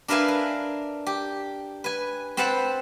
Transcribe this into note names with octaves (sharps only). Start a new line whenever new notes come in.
D4 A#4 B4 E5 F5 G#5
A#4
G4
B4 G#5
C4 B4 C5 F#5 A5 B5